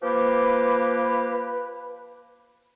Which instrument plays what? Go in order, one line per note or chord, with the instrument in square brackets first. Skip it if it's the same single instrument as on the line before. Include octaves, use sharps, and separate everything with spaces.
[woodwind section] F3 A#3 G4 B4